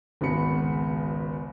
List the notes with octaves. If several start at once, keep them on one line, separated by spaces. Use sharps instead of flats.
G#1 C#2 B3 F#4 B5 C#7